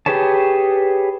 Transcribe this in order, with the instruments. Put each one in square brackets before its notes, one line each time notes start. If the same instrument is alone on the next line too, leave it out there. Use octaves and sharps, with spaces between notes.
[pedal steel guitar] G4 G#4 B4 C#5 A5